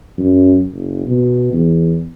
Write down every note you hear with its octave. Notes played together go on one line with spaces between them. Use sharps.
F#2
F#1
B2
E2